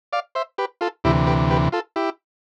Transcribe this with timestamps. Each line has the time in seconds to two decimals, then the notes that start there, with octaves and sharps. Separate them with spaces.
0.13 D5 F5
0.35 C5 E5
0.58 G4 B4
0.81 F4 A4
1.04 D2 C3 E3 E4 G4
1.27 G4 B4
1.51 G4 B4
1.72 F4 A4
1.96 E4 G4